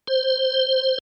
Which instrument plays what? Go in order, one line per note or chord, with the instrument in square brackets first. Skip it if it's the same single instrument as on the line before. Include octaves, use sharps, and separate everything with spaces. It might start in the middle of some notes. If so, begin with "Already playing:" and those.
[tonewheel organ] C5